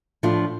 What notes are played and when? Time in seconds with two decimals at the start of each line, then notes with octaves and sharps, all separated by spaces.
0.23 A2 F3 A3 D4 F4